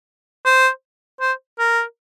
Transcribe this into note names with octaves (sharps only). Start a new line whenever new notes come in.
C5
C5
A#4